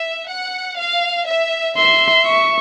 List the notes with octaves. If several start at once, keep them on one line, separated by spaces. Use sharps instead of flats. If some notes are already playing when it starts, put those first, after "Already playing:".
Already playing: E5
F#5
F5
E5
E5 C6
C#6